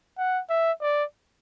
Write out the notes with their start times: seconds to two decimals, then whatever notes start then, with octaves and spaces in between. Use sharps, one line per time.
0.18 F#5
0.50 E5
0.81 D5